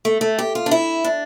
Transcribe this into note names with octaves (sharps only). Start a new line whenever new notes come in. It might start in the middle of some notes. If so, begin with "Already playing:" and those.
A3
A3
G4
F4
D4
E4
D4